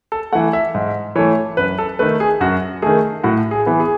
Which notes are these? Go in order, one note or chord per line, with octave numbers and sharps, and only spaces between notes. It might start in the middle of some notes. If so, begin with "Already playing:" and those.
A4
E3 A3 F#5
E5
G#2
E3 A3 C#5
F#2 B4
A4
D#3 A3 B4
G#4
F#2 F#4
D#3 A3 G#4
A2 F#4
G#4
E3 B3
G#4